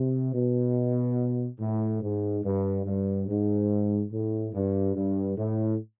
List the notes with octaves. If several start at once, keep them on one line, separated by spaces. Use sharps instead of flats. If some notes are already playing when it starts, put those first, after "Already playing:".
Already playing: C3
B2
A2
G#2
G2
G2
G#2
A2
G2
G2
A2